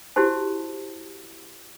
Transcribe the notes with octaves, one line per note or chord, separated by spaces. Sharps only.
E4 F#4 G4 C5 A5